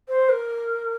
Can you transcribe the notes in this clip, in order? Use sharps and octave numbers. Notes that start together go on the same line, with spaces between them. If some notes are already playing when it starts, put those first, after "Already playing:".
C5
A#4